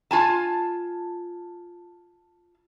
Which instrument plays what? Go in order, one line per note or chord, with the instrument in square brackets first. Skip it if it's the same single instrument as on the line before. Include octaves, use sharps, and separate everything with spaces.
[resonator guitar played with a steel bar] F4 G#5 A5